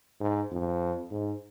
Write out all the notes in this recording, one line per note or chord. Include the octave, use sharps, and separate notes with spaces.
G#2
F2
G#2